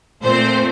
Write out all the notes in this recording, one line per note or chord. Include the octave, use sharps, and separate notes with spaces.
A#2 A3 C4 C5